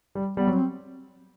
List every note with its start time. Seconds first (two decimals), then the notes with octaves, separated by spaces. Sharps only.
0.15 G3
0.37 G3 B3
0.47 F#3
0.53 C4